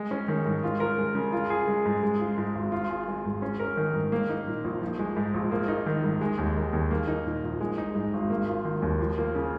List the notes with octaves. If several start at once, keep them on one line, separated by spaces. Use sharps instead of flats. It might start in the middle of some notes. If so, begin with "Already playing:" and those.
Already playing: G#3
C#4
D#3
G#2
F4
A#4
G#3
C#3
F4
G#4
G#3
G#2
G#3
F4
G#2
G#1
F4
G#4
G#3
G#2
C#4
A#4
D#3
G#2
A#3
D#4
A#2
A#1
F3
G#3
G#2
A#1
A#3
D#4
D#3
G#2
G#3
D#2
D#3
D#2
A#3
D#4
A#2
A#1
G#3
D#4
G#2
G#1
A#3
F4
D#3
D#2
F3
A#3
C#3